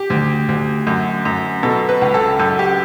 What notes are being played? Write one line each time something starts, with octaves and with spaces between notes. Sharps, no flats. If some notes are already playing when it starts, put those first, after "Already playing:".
Already playing: G4
D2
D2
F#2
F#2
B2 A4
B4
C#2
A4
F#2 A4
G4